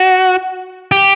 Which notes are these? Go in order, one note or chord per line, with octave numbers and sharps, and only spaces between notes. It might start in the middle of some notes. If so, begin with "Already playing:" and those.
Already playing: F#4
G4